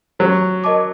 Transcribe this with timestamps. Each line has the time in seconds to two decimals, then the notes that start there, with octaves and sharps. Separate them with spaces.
0.19 F#3 G4
0.64 A#4 D#5 A5 D6